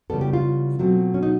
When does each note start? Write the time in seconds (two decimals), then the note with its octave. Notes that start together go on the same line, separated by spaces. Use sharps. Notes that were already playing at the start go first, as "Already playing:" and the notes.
0.10 C#3 E3 G3 B3 A4
0.21 G4
0.33 F4
0.79 B2 F#3 A3 C4
1.14 C#4
1.23 D#4